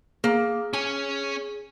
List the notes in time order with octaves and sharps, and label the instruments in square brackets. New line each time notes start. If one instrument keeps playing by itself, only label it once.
[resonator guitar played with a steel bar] A#3 [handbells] G#4
[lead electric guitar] C#4 C#5 [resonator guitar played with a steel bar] G#5